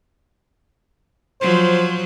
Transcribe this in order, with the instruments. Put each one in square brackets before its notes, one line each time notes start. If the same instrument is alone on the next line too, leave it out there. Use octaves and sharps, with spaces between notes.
[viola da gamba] F3 F#3 [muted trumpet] C5